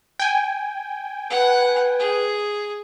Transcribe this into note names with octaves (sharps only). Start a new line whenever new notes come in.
G5 G#5
B4 F#5
G#4